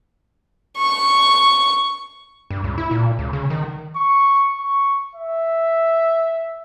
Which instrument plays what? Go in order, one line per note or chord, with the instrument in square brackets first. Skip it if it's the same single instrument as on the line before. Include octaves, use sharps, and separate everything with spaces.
[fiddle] C#6
[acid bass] G2
C#2
E4
A#2
C#2
C#3
D#3
[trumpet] C#6
C#6
E5